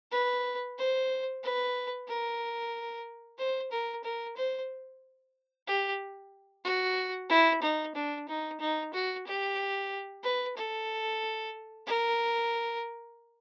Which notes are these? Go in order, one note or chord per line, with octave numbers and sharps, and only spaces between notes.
B4
C5
B4
A#4
C5
A#4
A#4
C5
G4
F#4
E4
D#4
D4
D#4
D#4
F#4
G4
B4
A4
A#4